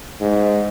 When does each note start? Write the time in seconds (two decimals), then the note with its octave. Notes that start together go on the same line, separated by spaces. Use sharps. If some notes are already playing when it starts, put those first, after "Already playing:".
0.21 G#2